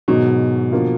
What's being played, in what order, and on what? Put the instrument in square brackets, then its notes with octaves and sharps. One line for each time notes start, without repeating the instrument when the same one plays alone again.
[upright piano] G#2 D#3 F#3 [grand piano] B2
[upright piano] D3 F3 A#3 F4